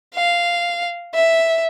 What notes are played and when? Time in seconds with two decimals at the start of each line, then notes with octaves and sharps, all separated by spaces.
0.14 F5
1.14 E5